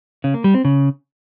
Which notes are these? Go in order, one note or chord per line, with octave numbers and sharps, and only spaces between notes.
C#3
A#3
G3
C4
C#3